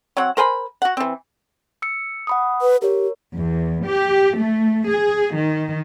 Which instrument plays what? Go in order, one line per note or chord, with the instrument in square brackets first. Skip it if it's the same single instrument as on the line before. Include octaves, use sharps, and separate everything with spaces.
[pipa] F#3 C4 C#5 F#5
A#4 C5 G#5 B5
F#4 F#5
E3 C4
[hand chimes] E6 C#7
F#5 B5 D#6
[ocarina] B4
[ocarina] G4 [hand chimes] A#4 C#5
[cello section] E2
G4
A3
G#4
D#3